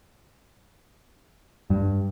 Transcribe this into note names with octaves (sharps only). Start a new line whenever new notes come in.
G2